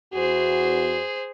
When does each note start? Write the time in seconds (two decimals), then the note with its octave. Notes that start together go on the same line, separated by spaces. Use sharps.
0.14 E2 F#4 G#4 C5